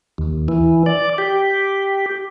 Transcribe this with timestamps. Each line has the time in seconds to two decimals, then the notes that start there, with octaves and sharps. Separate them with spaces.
0.18 D#2
0.48 E3
0.86 D5
1.18 G4